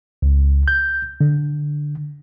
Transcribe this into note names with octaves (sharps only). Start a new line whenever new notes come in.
C#2
G6
D3